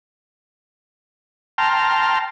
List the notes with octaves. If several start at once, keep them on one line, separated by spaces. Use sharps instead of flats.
G5 A5 A#5 C6 F6